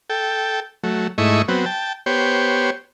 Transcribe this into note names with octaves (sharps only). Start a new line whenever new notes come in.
A4 G5
F#3 A3
G#2 A3 E4 D#5 C#6
F#3 B3 C4
G5 A5
B3 G4 C5 C#5